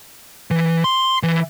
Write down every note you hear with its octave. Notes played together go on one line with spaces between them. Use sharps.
E3
C6
E3